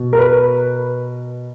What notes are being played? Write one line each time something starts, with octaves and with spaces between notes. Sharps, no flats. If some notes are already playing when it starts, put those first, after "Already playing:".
Already playing: B2
A#4
B4